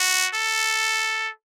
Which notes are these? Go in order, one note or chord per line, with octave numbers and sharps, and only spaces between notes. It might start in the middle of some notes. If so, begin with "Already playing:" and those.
Already playing: F#4
A4